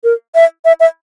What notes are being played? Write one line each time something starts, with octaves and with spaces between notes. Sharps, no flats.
A#4
E5
E5
E5